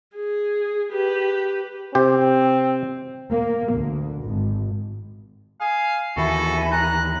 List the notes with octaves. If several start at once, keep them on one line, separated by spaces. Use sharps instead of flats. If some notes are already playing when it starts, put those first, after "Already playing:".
G#4
G4 B4
C3 C4 G4 C5
A#3
D2
G#1
F5 G#5
D#2 D#3 E3 F#4 A4 E5 G#5 B5
A#5 F#6